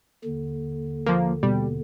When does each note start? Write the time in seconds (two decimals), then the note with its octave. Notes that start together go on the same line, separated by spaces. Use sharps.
0.24 D#2 D3
1.06 F3 A#3
1.43 B2 G3